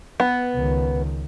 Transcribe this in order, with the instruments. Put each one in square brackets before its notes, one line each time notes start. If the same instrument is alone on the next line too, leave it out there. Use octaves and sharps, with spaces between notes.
[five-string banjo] B3
[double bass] C#2 D#3